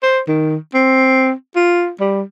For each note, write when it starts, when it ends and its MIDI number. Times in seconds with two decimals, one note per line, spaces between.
0.03 0.20 72
0.28 0.57 51
0.74 1.32 60
1.56 1.90 65
2.00 2.22 55